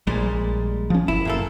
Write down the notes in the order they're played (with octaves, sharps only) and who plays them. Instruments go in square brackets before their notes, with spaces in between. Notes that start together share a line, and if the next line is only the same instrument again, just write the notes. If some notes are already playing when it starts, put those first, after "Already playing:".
[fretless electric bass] A#1 [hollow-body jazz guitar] A#2 G3 G#3
[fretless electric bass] F3 C#4
[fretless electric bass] F#1 [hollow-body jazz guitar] E4
[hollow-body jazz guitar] A#2 A#3 A4